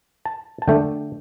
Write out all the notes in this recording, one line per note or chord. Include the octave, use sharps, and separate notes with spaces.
A5
A5
D3 A3 D4 G5